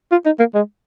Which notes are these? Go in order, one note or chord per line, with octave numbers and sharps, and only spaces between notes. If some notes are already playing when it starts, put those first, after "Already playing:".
F4
D#4
A#3
G#3